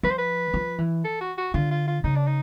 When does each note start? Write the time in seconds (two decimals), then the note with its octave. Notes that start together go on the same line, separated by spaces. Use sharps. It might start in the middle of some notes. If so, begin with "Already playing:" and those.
0.03 F3 B4
0.11 C5
0.18 B4
0.54 F3
0.78 E3
1.04 A4
1.21 F#4
1.38 F#4
1.54 D3 F4
1.71 F4
1.87 F4
2.04 C#3 D#4
2.16 D4
2.27 D#4